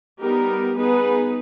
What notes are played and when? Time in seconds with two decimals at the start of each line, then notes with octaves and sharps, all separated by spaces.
0.20 G3 B3 D#4 G4 A#4
0.76 B3 D#4 G#4 B4